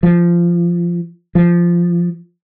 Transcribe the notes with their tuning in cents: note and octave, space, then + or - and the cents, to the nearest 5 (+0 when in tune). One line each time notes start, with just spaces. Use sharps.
F3 -15
F3 -10